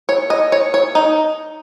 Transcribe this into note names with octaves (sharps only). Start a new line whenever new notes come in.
C#5
D#5
C#5
C#5
D#4